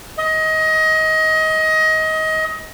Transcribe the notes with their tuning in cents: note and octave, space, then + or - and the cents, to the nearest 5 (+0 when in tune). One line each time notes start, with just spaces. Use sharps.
D#5 +25